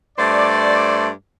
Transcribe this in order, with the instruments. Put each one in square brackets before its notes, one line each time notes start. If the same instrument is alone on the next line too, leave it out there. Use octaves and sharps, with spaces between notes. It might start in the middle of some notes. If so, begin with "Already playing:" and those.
[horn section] G2 A3 C5 D5